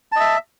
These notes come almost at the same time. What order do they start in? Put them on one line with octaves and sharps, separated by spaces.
A5 D#5 E5